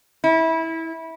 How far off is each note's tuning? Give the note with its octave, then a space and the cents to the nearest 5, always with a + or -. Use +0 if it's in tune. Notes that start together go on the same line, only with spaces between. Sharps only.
E4 -20